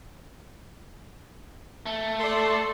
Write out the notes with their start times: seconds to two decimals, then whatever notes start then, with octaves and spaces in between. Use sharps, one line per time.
1.86 A3
2.19 A4 D5 C6